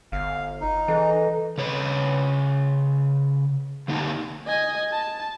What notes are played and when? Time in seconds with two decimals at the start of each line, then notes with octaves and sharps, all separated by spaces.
0.12 G1 F5
0.61 D#4
0.88 E3 A4 D#5
1.58 C#3 B4 C#5
3.88 D3 A#3 D#4 G4 A5 A#5
4.47 D#5 G#5
4.92 A5